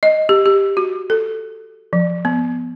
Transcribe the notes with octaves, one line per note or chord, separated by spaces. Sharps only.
D#5
G4
G4
F#4
A4
F3
B3